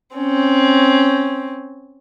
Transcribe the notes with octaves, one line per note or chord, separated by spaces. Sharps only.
C4 C#4